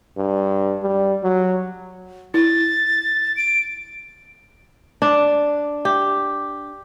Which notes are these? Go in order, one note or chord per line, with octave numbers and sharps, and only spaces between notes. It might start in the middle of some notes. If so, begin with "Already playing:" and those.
G2
G3
F#3
E4 A6
D7
D4
G4